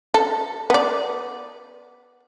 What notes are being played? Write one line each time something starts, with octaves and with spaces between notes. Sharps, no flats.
A4
B3 D5